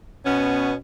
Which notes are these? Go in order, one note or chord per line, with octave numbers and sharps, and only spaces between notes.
B2 B3 C#4